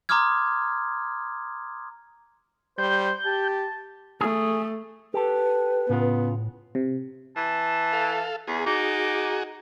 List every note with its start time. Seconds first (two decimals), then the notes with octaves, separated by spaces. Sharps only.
0.09 A#5 C6 D6 D#6 F6 G#6
2.78 G3 C5 G6
3.25 G4 A5
4.21 A3 G#4
5.14 G4 A4 B4
5.89 A2 C#3 B3 F4
6.75 C3
7.36 E3 A5
7.93 A4 F5
8.48 E2 G#4
8.66 D#4 F#4 G#4 D6